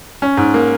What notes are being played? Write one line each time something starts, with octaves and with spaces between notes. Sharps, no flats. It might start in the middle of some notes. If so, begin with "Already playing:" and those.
C#4
G#2
A#3